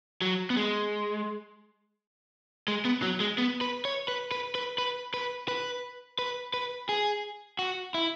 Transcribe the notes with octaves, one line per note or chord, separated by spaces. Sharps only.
F#3
B3
G#3
G#3
B3
F#3
G#3
B3
B4
C#5
B4
B4
B4
B4
B4
B4
B4
B4
G#4
F#4
E4